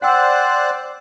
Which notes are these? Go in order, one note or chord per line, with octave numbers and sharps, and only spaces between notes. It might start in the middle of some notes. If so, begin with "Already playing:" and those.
C5 D5 F#5 G5 E6 F#6